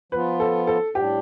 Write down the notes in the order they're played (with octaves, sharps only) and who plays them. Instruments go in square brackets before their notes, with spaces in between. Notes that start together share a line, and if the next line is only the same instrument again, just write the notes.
[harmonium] F3 B3 F4 [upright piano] B4
[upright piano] A4
A4
[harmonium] A2 G3 D4 [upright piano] G4